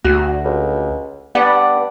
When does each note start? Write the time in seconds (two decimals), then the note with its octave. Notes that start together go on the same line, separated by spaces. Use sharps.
0.04 D2 F#4
0.44 C#2
1.35 G2 B3 D5 F#5